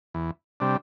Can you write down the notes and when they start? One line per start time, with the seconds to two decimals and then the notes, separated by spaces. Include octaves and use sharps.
0.14 E2
0.60 C3 G3 D4